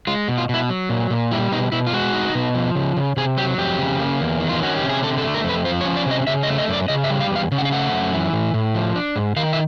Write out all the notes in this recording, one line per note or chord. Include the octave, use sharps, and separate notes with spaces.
G#3 F4
B2
F4
B2 E4
F#3
A#2
A#2
G3 E4
B2 D#4
B2 E4
F4
G#3 F#4
D#4
B2
F3
C#3
C#3
C3 G#4
F#3 G4
F2 G4
C#3
A#3
E2
D#3
F4
C#4 F#4
G4
C3
G#4
D3 A4
A4
A3
A#4
F2 B4
F3 C5
C#5
C#4
D5
C3
D#5
C#3 E5
D#5
A3
D#5
F#2
D5
C#3 D#5
E5
G3
F5
E2
F5
C#3
F#5
F5
A3 F#5
F#2
E3
A2
A2
F3
D4
G#2
D#3 F5
E5